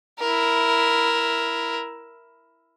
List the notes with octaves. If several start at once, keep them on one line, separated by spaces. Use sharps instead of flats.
E4 A#4